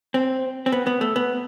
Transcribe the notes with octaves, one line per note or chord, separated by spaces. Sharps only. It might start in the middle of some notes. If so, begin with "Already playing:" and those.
C4
C4
B3
B3
A3
B3